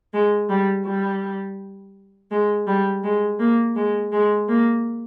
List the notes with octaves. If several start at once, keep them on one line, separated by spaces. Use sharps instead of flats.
G#3
G3
G3
G#3
G3
G#3
A#3
G#3
G#3
A#3